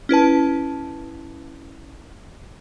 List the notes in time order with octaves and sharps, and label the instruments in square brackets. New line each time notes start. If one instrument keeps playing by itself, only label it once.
[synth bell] C#4 E4 B4 A5